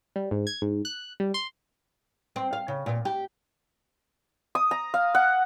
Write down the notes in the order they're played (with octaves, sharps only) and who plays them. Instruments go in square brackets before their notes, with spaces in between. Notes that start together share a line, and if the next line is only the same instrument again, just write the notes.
[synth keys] G3
G#2
G#6
G#2
F#6
G3
C6
[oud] C4
F5
C#3
A#2
G4
[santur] D#6
A#5
F5
F#5